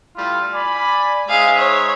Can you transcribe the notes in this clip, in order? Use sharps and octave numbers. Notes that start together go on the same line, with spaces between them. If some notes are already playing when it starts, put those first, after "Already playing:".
G3 A3 E4 F4
D5 G#5 B5
G#3 D#4 G#4 C5 E5 F5
C#5